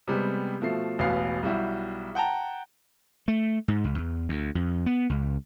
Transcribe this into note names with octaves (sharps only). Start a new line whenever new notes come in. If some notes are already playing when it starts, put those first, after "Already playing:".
C3 G3 G#3 B3
B2 F3 A3 C7
E1 A1 B2 B3 F5 C7
B1 G3 E4 F#4
F#5 G5 A5 A#5
A3
G#2
C#2
E2
D2
F2
B3
C#2